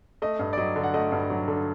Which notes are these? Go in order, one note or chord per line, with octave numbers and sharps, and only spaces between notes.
A3 D#5
G2
D5
F#3 D#5
D3
F#5
A3 D#5
G2
F#3
D3